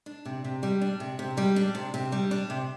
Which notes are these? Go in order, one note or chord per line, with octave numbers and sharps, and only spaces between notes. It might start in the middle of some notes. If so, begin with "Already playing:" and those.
D4
C3
C3
G3
D4
C3
C3
G3
D4
C3
C3
G3
D4
C3